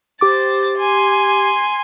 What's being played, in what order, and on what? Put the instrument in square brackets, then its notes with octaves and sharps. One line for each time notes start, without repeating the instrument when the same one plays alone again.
[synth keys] G4 D6 [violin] C5 A6
[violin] G#5 C6